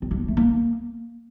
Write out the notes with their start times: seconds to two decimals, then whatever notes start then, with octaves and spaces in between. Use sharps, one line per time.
0.02 C4
0.11 D4
0.19 A#3
0.28 A3
0.37 A#3